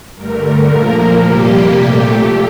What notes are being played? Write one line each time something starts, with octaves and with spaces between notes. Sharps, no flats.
G2 D3 A3 A#4
A#2 F3 A#3
F2 C3 G3 A#3 G4
A#2 A3